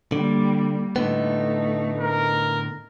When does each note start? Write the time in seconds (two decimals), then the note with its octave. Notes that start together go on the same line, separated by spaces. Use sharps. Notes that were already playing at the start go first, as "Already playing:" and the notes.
0.12 D3 G3 A#3
0.96 A2 D3 A3 B3 D#4
2.00 A#4